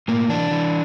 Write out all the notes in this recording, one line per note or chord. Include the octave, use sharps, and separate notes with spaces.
A2 A#3
E3 D4
E3